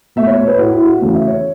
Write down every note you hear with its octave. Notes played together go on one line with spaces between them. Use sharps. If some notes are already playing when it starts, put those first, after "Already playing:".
B2 A3 E5
C#5
C#5
B4
A2 A3 F#4
E4
F#4
E2 C#3 A3
E5
C#5